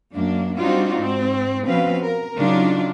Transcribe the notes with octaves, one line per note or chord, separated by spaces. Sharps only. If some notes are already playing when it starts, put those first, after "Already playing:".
F#2 A#3 D4
G3 C4 D4 D#4 F4 F#4
G#2 C4
B2 F3 C4 C#4 B4 F5
A#4
C#3 F#3 D4 D#4 F4